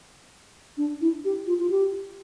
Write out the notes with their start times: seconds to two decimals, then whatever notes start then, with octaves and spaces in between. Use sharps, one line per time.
0.78 D4
1.01 E4
1.25 G4
1.47 F4
1.60 F4
1.70 G4